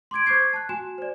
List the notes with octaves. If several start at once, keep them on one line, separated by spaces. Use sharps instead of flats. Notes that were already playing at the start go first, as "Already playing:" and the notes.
C6 D6 G#6 D7
C5 C#6 D6 G6 G#6 C7
A5 F#6
F#4 G#5 E7
C5 D5